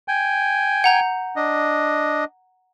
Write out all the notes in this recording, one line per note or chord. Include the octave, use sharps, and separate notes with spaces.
G5 G#5
F#5 A#5 G6
D4 D#5